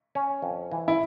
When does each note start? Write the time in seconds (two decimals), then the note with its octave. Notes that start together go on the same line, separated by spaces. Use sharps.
0.15 C#4
0.42 F2
0.72 E3
0.88 E4